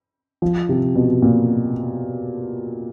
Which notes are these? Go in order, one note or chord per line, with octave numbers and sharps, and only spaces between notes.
F3
C3
B2
A#2